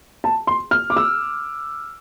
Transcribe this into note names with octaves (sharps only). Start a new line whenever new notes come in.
A5
C6
F6
D6
E6